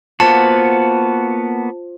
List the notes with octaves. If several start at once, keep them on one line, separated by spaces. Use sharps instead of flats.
A#3 B3 F4 F#4 C5 A5 D6